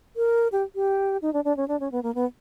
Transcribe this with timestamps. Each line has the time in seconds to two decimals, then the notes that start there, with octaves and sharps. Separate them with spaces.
0.16 A#4
0.52 G4
0.75 G4
1.22 D#4
1.34 D4
1.45 D4
1.57 C#4
1.68 D4
1.80 C#4
1.92 B3
2.03 A#3
2.15 B3